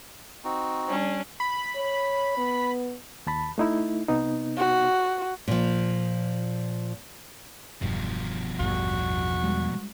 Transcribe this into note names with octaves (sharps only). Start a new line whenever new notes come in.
C4 D#4 F#4
G3 C#4 D4
B5
C#5
B3
D#2 A5 B5
A3 D#4 E4
C3 B3 D#4
F#4
A#2 F3
E1 E2 G2 B2 F3
A1 E2 G2 B3 F#4
G3 G#3